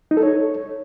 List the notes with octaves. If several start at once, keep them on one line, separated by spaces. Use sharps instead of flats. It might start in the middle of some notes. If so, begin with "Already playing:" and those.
D#4
A4
C#5